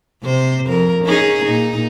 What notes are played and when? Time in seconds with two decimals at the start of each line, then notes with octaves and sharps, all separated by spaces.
0.23 C3 C5
0.66 F2 A#4
1.04 C#4 D#4 G#4
1.45 A#2 D#4